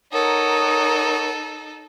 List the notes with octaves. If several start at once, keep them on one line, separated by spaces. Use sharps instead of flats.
D#4 A4 A#4 C#5 F#5 D#6